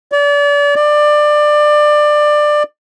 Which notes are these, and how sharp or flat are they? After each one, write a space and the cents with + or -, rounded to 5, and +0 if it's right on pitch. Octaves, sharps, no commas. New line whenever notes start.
D5 -35
D5 +20